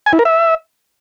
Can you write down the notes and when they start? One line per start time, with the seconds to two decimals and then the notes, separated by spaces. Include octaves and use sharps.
0.06 G#5
0.13 E4
0.19 A#4
0.25 E5